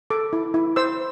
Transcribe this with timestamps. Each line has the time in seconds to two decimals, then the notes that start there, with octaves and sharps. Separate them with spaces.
0.10 A4 D6
0.33 E4
0.54 E4
0.76 C5 E6